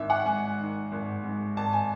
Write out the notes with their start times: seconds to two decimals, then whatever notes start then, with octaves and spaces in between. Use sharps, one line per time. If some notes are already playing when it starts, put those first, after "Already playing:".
Already playing: G#1 D#3 E5
0.10 F#5
0.26 G#2 G#5
0.59 D#3
0.92 G#1
1.24 G#2
1.56 G#1 A5
1.73 G#5